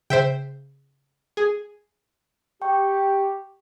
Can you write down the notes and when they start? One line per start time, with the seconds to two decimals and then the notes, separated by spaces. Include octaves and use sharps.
0.10 C#3 C5 E5 G5
1.37 G#4
2.62 G4 G5 C#6